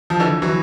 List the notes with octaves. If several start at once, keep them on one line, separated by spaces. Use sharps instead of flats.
F3
D3 E3
E3 F#3